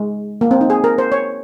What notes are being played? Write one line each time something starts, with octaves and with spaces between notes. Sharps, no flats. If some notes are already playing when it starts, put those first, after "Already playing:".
Already playing: G#3
A#3
C4
D#4
G#4
A#4
C5
C#5